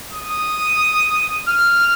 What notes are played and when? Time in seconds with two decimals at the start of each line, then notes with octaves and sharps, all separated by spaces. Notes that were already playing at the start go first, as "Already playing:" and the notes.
0.13 D#6
1.47 F6